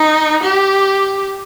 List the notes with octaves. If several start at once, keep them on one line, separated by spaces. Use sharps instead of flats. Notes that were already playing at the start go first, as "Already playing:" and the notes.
Already playing: D#4
G4